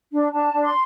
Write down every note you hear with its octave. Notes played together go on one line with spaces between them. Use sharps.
D4
D4 A5
D4
C6